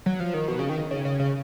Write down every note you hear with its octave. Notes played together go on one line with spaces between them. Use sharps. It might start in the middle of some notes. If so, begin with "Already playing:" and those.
F#3
F3
D#3
B2
C#3
D#3
C#3
C#3
C#3